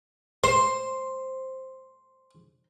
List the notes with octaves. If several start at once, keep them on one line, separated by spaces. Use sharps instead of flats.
C5 C6